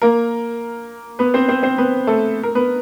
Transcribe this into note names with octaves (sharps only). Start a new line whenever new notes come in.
A#3 A#4
B3 B4
C4 C5
C4 C5
C4 C5
B3 B4
A3 A4
A#4
B3 B4